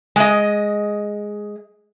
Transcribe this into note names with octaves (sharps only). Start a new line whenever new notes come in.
G#3 D#5